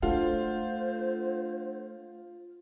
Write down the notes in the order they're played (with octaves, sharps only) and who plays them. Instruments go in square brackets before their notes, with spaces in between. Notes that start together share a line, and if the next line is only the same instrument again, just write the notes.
[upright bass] A3 [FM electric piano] D4 A4 F#5 [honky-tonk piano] F4 [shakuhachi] C5